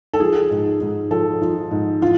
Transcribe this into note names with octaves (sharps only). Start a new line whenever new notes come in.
A4
F3 G#4
G#2
G#2
F3 A4
F3
G#2
E3 F4